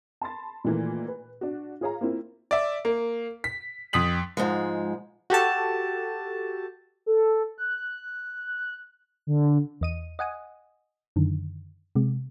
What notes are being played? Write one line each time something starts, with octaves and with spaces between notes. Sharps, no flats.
A5 B5 C6 A6
A#2 D#3 E3 A3 A#3
B4
D4 F#4
F4 G#4 C#5 F5 A#5
A#3 C4 E4 F4 A#4
D5 E5
A#3
B6
F2 D#6 B6 F#7
G#2 F3 G#3
F#4 G4 A4 A5
A4
F#6
D3
E2 D#5 D#7
D#5 F#5 G#5 D#6
F#2 D3 D#3
C3 G#3